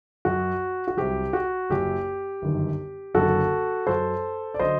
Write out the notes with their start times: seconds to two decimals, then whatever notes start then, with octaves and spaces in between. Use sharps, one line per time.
0.25 F#2 F#3 F#4
0.88 F#4
0.97 C2 C3 F#3 G4
1.33 F#4
1.69 F#1 F#2 F#3 G4
2.42 G1 F#2 D#3
3.14 F#1 F#2 D3 F#3 F#4 A4
3.87 F#2 F#3 A4 C5
4.54 D5
4.59 D3 F#3 C5 D#5